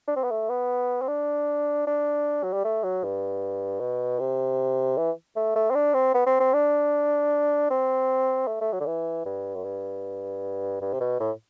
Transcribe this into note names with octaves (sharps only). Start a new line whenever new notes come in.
D4
C4
B3
A3
B3
C4
D4
D4
F#3
G3
A3
F#3
G2
B2
C3
E3
A3
A3
C4
D4
C4
B3
C4
C4
D4
C4
A3
A3
F#3
D3
E3
G2
F#2
G2
G2
C3
B2
A2